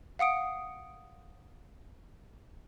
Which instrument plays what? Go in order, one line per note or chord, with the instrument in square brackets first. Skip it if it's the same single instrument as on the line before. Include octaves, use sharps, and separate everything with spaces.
[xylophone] F5 F#5 D#6 D7